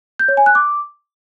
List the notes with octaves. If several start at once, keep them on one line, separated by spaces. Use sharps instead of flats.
G6
C#5
G#5
F#6
D6